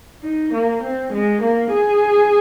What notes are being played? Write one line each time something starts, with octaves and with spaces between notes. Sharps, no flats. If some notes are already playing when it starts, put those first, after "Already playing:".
D#4
A#3
C4
G#3
A#3
G#4